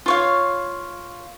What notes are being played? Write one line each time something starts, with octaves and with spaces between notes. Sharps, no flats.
F4 C#5 F5